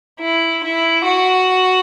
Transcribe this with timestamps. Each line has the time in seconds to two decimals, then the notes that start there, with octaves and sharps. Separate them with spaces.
0.20 E4
0.63 E4
1.06 F#4